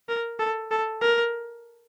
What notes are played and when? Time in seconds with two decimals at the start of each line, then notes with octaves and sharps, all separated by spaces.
0.09 A#4
0.39 A4
0.71 A4
1.02 A#4